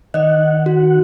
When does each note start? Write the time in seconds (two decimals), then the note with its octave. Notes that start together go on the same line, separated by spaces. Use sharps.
0.14 D#3 D5 D#5 F#5
0.66 F#4